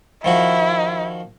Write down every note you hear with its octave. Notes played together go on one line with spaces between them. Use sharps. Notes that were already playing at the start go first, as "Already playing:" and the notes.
D#3 F3 E4 F#4